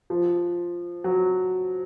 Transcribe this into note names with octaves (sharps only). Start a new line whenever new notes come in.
F3
F#3